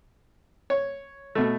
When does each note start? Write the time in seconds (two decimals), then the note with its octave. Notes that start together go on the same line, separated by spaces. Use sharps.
0.70 C#5
1.35 B2 A3